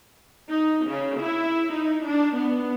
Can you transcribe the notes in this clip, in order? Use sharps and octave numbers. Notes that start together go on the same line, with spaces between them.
D#4
C#3
E4
D#4
D4
B3